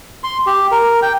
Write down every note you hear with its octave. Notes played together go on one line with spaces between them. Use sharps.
C6
G4
A#4
G5